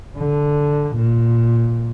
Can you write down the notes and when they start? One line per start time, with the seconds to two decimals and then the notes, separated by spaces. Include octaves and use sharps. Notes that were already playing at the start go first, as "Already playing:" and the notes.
0.18 D3
0.96 A#2